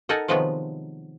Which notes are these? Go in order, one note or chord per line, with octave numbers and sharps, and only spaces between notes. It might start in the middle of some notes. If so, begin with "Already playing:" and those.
D#4 A4 A#4 F#5 G#5
C3 D#3 F3 F#3 G#3 B3